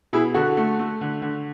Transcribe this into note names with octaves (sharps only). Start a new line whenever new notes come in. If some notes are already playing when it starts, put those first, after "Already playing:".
B2 E4 G#4
D3 F#4 A4
A3
A3
D3
D3